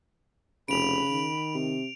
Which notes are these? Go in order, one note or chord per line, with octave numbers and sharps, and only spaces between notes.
F1 C#3 B5 D7 F7
D#3
C3